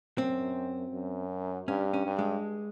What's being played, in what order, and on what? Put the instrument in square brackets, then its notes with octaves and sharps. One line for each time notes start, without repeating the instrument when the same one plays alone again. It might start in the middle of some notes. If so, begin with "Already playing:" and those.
[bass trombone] F#2 [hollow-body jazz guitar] C4
[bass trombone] F#2
[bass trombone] G2 [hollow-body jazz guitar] C#4
[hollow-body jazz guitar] C#4
[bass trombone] G2
[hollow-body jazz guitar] G#3